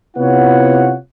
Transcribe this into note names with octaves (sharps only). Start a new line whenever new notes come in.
C3 B3 E4 F4 C#5 F#5